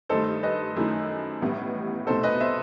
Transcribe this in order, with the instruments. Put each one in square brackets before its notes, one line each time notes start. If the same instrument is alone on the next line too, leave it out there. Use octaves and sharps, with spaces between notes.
[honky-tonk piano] G2 D#3 A3 D#4 [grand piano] A4 C5
[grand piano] B4 D#5
[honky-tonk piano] F#2 D#3 A3 E4
A1 A2 G3 B3
[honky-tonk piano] C2 B2 A3 D#4 [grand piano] A4 C5
[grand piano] B4 D#5
C5 E5